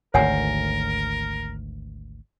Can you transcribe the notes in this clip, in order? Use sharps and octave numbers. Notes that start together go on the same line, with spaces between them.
G#1 D2 A#4 C#5 F#5 G#5